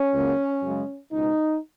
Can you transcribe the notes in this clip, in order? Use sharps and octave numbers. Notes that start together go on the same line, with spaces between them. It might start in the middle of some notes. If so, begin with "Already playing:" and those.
Already playing: C#4
C#2 C#3 F#3 A#3
F#2 C#3 G#3
C#2 B2 G#3 D#4